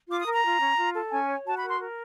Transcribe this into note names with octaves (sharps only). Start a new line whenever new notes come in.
F4 D6
D#6
A#4
A#5
F4
C#4
F4
A4
C#4 G#5
C#5
F#4 A5
B5
A#4
C6
A#4